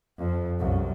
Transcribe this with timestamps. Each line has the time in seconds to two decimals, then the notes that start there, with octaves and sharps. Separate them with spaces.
0.18 F2
0.59 C2 F#2